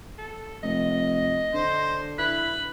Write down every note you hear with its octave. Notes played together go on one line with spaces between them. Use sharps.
A4
F1 D#5
D3 C5
E4 B4